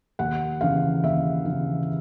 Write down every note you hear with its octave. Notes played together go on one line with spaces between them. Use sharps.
D#2 F#5
C#3 E3 F5
D#2 E5
C#3 E3